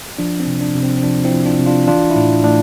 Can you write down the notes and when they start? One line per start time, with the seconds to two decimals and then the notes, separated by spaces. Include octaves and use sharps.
0.18 F3 D4
0.40 C4
0.47 C3
0.61 D4
0.75 C3
0.83 C4
0.97 C4
1.03 F3 D4
1.24 C4 E4
1.31 F3
1.46 D4 F4
1.60 C3
1.66 D4 F4
1.87 E3 D4 F4
2.10 E4
2.16 A2 D4
2.44 A2 D4